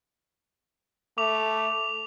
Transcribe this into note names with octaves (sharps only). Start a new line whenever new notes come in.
A3 D6 F7